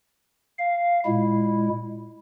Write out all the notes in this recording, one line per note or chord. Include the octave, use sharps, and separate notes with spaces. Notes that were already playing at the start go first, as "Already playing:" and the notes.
F5
A#2 G#3 E4